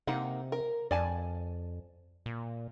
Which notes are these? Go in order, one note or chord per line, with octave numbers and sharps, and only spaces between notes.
C3 A#3 D#4 F#5
A#4
F2 D5 G#5 A5
A#2